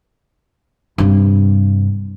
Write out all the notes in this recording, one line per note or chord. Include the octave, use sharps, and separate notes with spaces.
G2 C3